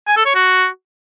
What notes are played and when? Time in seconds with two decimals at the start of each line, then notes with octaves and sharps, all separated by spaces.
0.08 G#5
0.17 A4
0.26 C#5
0.35 F#4